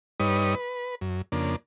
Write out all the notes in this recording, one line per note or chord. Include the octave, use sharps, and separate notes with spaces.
G2 G3 D#4 B4 C#5 D#6
B4
F#2
F2 C#3 A#3 D4